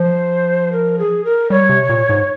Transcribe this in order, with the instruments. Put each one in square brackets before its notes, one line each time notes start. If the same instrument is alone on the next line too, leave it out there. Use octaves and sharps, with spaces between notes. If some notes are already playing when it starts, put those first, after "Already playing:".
Already playing: [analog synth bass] F3 [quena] C5
[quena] A#4
G#4
A#4
[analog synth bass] G3 [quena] C#5
[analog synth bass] C3
A#2
G#2